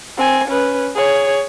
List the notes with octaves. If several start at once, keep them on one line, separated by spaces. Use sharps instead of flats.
C4 G#5
C#4 B4
G#4 C#5